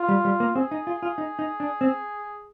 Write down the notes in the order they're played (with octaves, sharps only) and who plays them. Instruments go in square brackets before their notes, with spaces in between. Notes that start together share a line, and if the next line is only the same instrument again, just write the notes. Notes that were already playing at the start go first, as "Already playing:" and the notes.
Already playing: [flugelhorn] F4
[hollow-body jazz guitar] G3
G3
A#3
[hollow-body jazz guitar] C4 [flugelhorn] G#4
[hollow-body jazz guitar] D#4
F4
F4
D#4
D#4
D4
C4